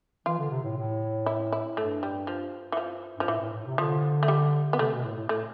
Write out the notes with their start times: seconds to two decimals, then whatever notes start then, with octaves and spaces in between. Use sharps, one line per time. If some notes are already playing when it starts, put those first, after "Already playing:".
0.26 E3 F4
0.39 D3
0.51 C3
0.64 A2
0.77 A2
1.26 E4
1.52 E4
1.77 G2 A3
2.03 G3
2.27 F3
2.72 E3
2.77 F3
3.18 G2 F3
3.28 A2 E3
3.40 A2
3.53 A2
3.66 C3
3.78 D3 F3
4.23 A3
4.28 G3
4.73 B3
4.78 C3 A3
4.92 B2
5.04 A2
5.17 A2
5.28 A2 A3